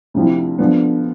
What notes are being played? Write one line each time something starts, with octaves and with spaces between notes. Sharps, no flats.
D2 C3 F3 C4 E4
D3 F3 B3